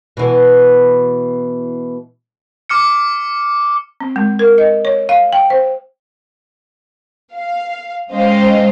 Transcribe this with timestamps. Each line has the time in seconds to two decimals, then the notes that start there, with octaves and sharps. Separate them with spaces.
0.17 B2 E3
2.69 D6 F6 C#7
4.00 C4
4.16 G#3
4.39 A#4
4.58 D#5
4.85 C#5
5.09 F5
5.33 G5
5.50 C5
7.34 F5
8.11 G#3 C#4 C5 D#5 F5 G5